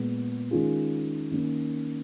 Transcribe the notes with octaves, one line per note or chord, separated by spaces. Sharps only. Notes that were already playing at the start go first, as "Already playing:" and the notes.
Already playing: A#2 G#3 B3
D#3 G#3 C#4 F4 G#4
D#3 A#3 C#4